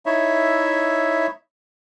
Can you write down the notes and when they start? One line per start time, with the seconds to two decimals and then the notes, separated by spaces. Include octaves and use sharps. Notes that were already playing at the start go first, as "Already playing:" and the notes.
0.06 D#4 E4 C#5 E5